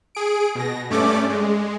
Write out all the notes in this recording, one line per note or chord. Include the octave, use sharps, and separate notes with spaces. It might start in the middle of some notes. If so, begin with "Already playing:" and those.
G#4 D7
B2 A#6
G2 A3 C#4 D5 D6
G#3